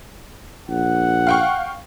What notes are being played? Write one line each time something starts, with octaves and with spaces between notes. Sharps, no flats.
A#1 F#5
F5 G5 C#6